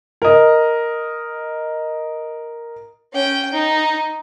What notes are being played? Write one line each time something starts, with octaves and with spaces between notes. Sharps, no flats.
A#4 D#5
C#4 G5
D#4